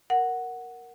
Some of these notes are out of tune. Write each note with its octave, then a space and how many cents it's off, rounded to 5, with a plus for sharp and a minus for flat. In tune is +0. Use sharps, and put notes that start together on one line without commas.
A#4 +0 F#5 +0